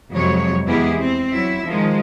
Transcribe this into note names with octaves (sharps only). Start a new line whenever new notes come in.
F2 C3 F#3 G#3 C#5
E2 G#3 B3 E4 G4 G#4
C4
F#3 E4 E5
D#3 F3 G#3